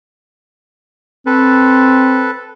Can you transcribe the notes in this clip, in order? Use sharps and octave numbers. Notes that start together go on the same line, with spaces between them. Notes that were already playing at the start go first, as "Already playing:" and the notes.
C4 A4 B4